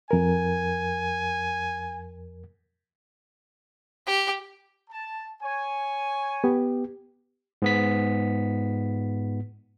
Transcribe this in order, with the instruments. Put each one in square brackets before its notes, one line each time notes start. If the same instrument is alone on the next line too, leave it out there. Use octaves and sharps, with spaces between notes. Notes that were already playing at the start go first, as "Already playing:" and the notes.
[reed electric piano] F2 A#4 [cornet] G#5
[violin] G4
[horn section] A5
C#5 G#5
[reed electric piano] B3 G4
[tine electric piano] G#2 B3 B6